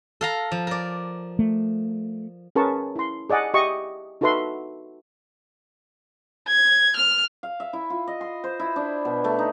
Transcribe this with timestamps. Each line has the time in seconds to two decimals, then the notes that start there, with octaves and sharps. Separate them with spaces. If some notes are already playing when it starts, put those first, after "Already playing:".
0.21 A4 F5 A#5
0.51 F3
0.67 A#4 D5
1.39 A3
2.56 C#4 G#4 A#4 B4 A5 C#6
2.96 E4 C6
3.30 G#4 D5 D#5 F#5 G#5
3.54 G4 D#5 E5 C#6
4.21 D#4 F#4 A4 B4 E5 C6
6.48 G#6
6.97 F6
7.43 F5
7.60 E5
7.73 E4
7.90 F4
8.08 D#5
8.21 C6
8.44 C5
8.59 E4
8.76 D4
9.05 B2
9.24 A3
9.39 D#4